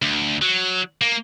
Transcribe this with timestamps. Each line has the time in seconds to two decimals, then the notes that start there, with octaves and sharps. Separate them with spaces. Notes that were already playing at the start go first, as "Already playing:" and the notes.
0.02 D2
0.42 F#3
1.01 A#3